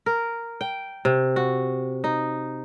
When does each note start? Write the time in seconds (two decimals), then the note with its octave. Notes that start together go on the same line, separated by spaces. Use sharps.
0.06 A#4
0.61 G5
1.05 C3
1.36 F#4
2.04 D#4